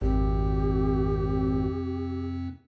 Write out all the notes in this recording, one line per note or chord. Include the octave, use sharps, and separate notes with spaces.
G#1 F2 C3 C4 G4